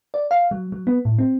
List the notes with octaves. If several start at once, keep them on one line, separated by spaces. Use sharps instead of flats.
D5
F5
F#3
F#3
B3
A2
C4